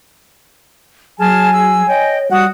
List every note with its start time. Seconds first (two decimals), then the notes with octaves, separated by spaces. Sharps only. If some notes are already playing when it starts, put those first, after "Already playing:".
1.20 F#3 G#4 G#5 A5 F6
1.53 G#4 E6
1.88 C#5 D#5 G5
2.31 G3 F#4 F#5 D#6